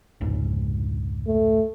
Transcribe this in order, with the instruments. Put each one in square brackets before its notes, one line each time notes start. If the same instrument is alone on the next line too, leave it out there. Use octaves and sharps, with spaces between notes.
[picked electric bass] F1 C#2 G#2
[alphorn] A3